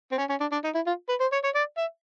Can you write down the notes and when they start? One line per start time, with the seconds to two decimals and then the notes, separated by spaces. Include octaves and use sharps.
0.12 C4
0.18 C#4
0.30 C#4
0.40 D4
0.52 D4
0.64 D#4
0.75 E4
0.87 F4
1.09 B4
1.21 C5
1.32 C#5
1.44 C#5
1.55 D5
1.77 E5